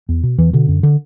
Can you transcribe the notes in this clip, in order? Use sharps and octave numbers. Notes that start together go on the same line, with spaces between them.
E2
B2
E2 E3
B2 D3
F#2
D3